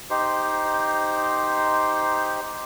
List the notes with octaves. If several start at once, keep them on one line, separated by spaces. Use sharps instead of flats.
D#4 G4 C5